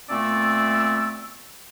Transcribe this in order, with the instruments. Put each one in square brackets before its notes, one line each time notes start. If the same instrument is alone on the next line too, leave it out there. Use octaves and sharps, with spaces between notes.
[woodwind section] A#2 A3 B3 C4 D5 E6